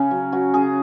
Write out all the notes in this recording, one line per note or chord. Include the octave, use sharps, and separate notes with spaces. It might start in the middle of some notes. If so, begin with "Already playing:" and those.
Already playing: C#3 C#4
F#3
F#3 F#4
C#3 G#4